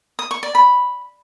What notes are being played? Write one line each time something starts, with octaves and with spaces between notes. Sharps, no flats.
D#6
C#6
D5
B5